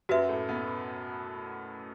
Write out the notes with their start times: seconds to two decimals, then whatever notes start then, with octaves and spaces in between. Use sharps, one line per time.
0.09 F#2 F#3 F#4 B4 E5
0.29 A2 A3
0.49 B2 B3